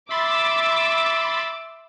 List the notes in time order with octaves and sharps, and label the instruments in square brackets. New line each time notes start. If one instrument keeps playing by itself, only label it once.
[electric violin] E5 E6 [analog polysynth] B5 C6 A6 [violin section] D6